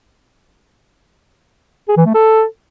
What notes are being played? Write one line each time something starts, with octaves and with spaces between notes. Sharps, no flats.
G#4
E3
A3
A4